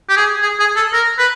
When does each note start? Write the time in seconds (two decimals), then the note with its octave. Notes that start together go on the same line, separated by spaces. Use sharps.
0.09 G4
0.17 G#4
0.43 G#4
0.60 G#4
0.76 A4
0.93 A#4
1.19 B4